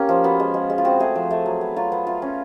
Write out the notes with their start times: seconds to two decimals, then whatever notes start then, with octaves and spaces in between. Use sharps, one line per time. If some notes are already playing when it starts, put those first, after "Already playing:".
Already playing: A#3 C#4 G4
0.09 F3
0.24 B3 F#4
0.40 G#3
0.54 G#3
0.70 G#3
0.78 F4
0.85 C4 F#4
1.00 A3 G#4
1.16 F3
1.31 A3
1.46 F#3
1.61 B3
1.76 F#3 F4
1.92 B3
2.07 F4
2.22 C#4